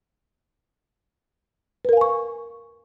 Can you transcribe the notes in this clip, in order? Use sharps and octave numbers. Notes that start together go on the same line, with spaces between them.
A#4 B4 F5 G#5 C#6